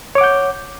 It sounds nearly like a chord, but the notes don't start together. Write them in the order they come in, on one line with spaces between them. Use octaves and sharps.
C#5 D6 F#5 G6